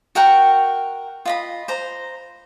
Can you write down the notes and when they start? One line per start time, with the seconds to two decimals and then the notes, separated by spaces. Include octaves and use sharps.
0.15 F#4 A#4 F#5 G5
1.25 F4 D#5 B5
1.68 C5 A#5